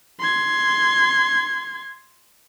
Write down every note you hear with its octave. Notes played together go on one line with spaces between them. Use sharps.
C6 G#6